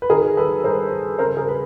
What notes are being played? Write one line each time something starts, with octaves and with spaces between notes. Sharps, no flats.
B4
D#3 G#4 A#4
D#3 A4 B4
G2 A#4 C5
G2
C#3 A#4 C5
G#4 A#4
B4